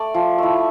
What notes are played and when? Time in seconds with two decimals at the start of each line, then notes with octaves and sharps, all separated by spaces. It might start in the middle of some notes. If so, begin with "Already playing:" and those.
Already playing: A3 D5
0.14 F3
0.38 A3 E4